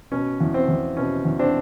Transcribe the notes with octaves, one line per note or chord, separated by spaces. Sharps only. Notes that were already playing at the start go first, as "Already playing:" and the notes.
B2 C#4
E2
C4
E2
B2 C#4
E2
C4 D4